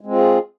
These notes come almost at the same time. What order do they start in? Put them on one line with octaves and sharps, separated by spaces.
G#3 C4 F4 G#4